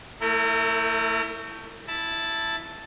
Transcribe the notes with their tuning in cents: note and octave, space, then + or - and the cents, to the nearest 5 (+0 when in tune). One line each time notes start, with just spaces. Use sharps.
A3 +25 E4 +0 A#4 -35
E4 +0 A5 +0